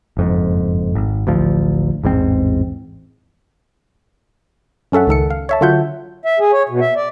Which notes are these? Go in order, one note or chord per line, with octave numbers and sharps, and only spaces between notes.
F#1 F2 G#2
G#1
A1 D2 F3
A1 E2 G#2 C4
F#2 C#4 A4 E5 F#5
C#2 D#3 A4 C#7
F5
C#5 E5 A5
D3 F#3 F4 E5 F#5 G6
E5
G#4
C#5
B2
E5
D5